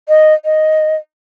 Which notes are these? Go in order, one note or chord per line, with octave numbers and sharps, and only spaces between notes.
D#5
D#5